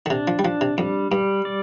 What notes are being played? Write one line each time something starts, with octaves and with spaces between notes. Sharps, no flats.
D3
C3 D4
F3
G3
F3 D4
C3
F2 G3
G2 G3
D5